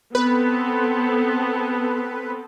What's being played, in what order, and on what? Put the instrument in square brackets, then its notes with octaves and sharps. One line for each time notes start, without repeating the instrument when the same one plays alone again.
[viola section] B3 C4 A4 [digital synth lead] B4